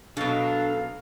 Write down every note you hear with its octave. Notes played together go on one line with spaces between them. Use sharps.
B2 F#3 D4 A4 F5